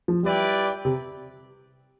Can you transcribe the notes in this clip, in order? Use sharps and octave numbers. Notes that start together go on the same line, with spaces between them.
F3
G3 E4 B4 D5 G5
C3